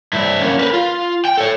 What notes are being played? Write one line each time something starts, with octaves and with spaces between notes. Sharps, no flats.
G2 E4
A#3 C#4
A#4 B4
F4
G5
A4 C#5